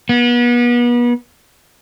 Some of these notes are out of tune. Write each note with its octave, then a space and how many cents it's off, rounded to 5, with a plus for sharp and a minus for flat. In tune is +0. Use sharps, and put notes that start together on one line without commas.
B3 -35